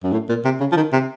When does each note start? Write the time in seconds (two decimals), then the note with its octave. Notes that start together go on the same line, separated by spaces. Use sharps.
0.04 F#2
0.12 A2
0.29 A#2
0.45 C3
0.60 C#3
0.72 F3
0.77 D#3
0.93 C3